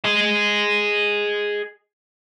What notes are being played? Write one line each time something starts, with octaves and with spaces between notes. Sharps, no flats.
G#4 D#5